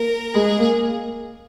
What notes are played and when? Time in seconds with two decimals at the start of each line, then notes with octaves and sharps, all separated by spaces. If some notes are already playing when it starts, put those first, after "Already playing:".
Already playing: A#3 A#4
0.35 G#3 G#4
0.59 A#3